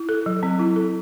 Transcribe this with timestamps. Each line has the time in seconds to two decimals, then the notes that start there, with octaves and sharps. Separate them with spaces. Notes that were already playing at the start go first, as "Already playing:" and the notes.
Already playing: E4
0.09 A4
0.26 F#3
0.43 C4
0.59 E4
0.76 A4